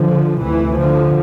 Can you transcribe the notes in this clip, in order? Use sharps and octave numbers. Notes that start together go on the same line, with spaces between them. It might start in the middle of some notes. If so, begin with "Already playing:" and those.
Already playing: D3 F3
D2 C3 E3
D3 F3